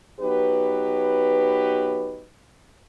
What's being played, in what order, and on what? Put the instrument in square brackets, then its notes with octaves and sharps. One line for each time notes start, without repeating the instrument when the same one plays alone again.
[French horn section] F#3 B3 D#4 G4 B4